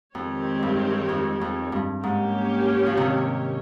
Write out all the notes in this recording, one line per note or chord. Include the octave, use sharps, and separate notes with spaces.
F2 D#3 G#3 C4 G4 C#5
G2
F2
F2
G2
G#2 A#3 C#4 G4 C#5
F3
C3 D#3